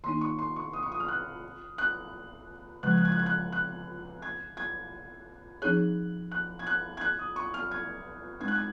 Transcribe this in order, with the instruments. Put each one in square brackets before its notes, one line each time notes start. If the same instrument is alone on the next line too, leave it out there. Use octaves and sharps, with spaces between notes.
[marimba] D#3 A#3 D#4 [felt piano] C6
[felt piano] C#6
C6
C#6
D#6
C#6
D#6
F6
F#6
F#6
[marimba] C#3 F3 G#3 [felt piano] F#6
[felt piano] G#6
F#6
G#6
F#6
G#6
F#6
F#6
G#6
G#6
[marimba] F3 C4 D#4 G#4 C#5 [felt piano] F#6
[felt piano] F#6
G#6
F#6
G#6
F#6
D#6
C#6
F6
G#6
[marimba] G#3 C4 D#4 [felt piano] G#6
[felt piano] F#6
G#6